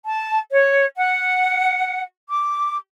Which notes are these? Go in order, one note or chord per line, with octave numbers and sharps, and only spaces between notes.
A5
C#5
F#5
D6